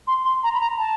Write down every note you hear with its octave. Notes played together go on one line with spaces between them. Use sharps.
C6
C6
A#5
B5
A#5
A5